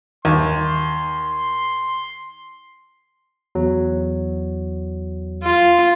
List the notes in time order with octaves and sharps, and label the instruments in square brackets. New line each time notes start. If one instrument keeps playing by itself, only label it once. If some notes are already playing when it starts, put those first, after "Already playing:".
[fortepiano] D#2 [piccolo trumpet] C6
[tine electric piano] E2 F#3
[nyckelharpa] F4